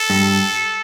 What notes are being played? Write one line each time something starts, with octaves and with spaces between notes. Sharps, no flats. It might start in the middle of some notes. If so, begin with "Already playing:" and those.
Already playing: A4
G2